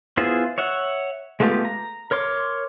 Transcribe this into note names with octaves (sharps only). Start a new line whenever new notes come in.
B3 E4 F4 G#4 C5
C#5 E5 F#5
G#3 A3 B3 F4 G4
A#5
A#4 C#5 C6 D6